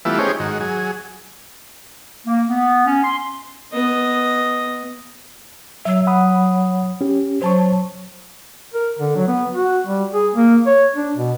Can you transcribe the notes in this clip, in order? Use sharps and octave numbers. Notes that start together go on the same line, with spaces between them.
E3 G3 A3 B3 E4 F4
C#4 D#4 G4 G#4 C5 C#5
G#2 D#3 F#4
F#3 G#4
A#3
B3
C#4
C6
B3 D#5
F#3 E5 E6
F#5 B5 D#6
C#4 G4
F#3 C5 A5 C#6
A#4
D3
F#3
B3
F#4
G3
G#4
A#3
C#5
D4
B2